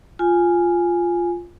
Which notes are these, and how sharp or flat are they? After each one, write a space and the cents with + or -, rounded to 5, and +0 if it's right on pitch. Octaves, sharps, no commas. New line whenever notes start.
F4 +0 G#5 +0